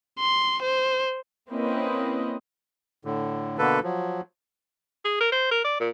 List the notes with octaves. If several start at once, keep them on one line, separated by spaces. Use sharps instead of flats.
C6
C5
A#3 C4 C#4 E4 B4 D#5
A2 D3
B2 D3 A#3 A4 B4
F3 F#3
G#4
A#4
C5
A#4
D5
A#2